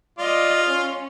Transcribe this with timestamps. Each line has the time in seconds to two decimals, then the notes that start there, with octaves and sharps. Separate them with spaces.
0.18 F4 D5 D#5
0.65 C#4